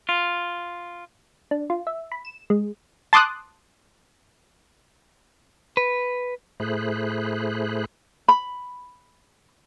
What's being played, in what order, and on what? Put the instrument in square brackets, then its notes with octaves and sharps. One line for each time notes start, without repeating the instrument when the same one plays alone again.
[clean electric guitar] F4
[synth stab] D4
F4
E5
B5
E7
G#3
[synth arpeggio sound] A5 C6 D6 D#6 F#6
[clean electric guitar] B4
[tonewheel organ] A2 A3 G#4 C5 B5 F#6
[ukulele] B5